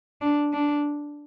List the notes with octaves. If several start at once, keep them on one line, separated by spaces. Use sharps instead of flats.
D4
D4